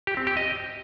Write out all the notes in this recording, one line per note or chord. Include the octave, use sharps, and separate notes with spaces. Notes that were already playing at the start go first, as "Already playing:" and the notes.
G4
C4
G4
D#5